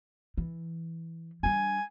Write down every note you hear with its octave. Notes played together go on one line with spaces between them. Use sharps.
E3
G3 D4 G#5